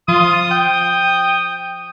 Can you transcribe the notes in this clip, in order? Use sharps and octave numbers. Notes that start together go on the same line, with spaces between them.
F3 F4 D#6
G5